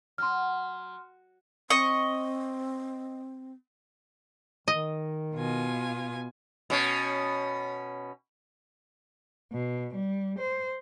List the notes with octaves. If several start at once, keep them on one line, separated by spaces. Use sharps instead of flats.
F#3 C6 F6
C4 D#5 C#6
D#3 D#5
B2 F4 G#5
B2 C#4
B2
G3
C5